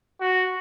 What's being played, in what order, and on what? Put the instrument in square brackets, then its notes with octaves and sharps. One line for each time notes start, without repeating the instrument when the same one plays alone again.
[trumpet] F#4